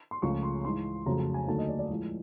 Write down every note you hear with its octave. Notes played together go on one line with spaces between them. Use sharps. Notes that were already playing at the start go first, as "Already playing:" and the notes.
C6
C#2 C#3 F3 A3 C#6
C6
G#2 E3 G#3 C6
F2 C#3 F#3 A3 A#5
A5
G#5
D#2 D3 F#3 A3 A5
D#5
D5
D5
A2 F3 G#3